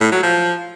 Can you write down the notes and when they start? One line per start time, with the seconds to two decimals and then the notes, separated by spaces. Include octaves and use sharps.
0.01 A2
0.12 F#3
0.22 F3